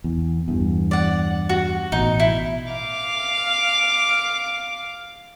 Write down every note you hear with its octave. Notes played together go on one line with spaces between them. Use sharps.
E2
E2 G2
D5 F#5
F#4
A1 B2 D#4
E4
F5 D6